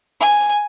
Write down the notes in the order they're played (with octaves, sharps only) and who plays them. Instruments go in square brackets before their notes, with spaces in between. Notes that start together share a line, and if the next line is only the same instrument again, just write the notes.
[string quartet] G#5